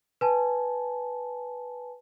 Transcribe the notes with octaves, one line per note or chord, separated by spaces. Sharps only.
B4 G#5 A5